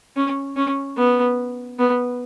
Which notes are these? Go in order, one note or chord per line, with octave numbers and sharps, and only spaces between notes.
C#4
C#4
B3
B3